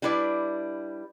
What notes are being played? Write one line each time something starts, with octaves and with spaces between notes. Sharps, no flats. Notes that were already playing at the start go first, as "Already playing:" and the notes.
G3 D4 E4 B4 D5